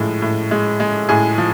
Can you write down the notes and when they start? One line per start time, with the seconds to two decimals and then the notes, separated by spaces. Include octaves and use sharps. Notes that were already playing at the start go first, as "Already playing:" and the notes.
Already playing: A2 F3 G#3
0.22 A2
0.51 G#3
0.80 G#3
1.09 A2 G#4
1.38 F3